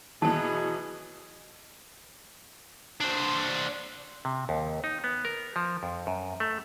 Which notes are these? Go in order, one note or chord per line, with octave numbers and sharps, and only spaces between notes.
B2 E3 F#3 B3 G#4 A5
D4 C5
C3
D#2
D#4
B3
A#4
F3
F2
F#2
A3